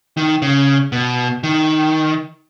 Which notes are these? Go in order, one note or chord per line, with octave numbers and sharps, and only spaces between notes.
D#3
C#3
B2
D#3